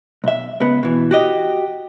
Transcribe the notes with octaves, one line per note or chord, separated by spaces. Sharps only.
B1 E5
C#2 B3
B2 E3
F#4 G4 D#5